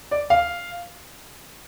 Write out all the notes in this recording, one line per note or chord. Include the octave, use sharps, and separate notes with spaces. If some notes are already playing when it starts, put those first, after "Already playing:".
D5
F5